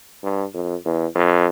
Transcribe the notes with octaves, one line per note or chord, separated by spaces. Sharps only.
G2
F2
E2
F2